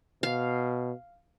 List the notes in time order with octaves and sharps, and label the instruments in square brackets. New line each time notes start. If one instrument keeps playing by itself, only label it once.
[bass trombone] B2 [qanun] F5